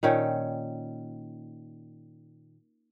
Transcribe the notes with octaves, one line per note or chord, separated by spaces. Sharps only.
A#2 D#3 C#4 G5